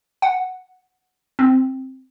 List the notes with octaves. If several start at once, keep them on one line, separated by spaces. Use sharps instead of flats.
F#5
C4